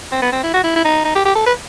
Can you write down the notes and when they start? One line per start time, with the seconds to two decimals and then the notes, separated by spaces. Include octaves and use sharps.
0.12 C4
0.22 B3
0.32 C4
0.43 E4
0.54 F#4
0.64 E4
0.76 E4
0.85 D#4
1.05 D#4
1.15 G4
1.26 G4
1.35 A4
1.46 B4